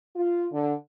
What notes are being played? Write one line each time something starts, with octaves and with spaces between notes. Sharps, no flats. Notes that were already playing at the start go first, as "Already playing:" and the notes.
F4
D3